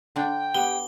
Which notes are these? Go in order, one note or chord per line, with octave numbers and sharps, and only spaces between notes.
D3 D4 G5
B3 G4 G7